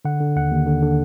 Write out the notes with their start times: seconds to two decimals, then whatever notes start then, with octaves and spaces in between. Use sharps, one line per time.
0.05 D3 F#5
0.20 D3
0.36 D#2 F#5
0.52 D#2
0.66 D3
0.82 D3